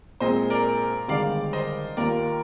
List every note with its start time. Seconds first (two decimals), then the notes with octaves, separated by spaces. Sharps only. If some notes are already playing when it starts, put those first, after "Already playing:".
0.20 A#2 G#3 C4 C5 D#5
0.50 A#4 D5
1.08 G1 G2 D#3 G#3 D5 F5
1.53 C5 D#5
1.97 D#2 D#3 A#3 F4 A#4 D5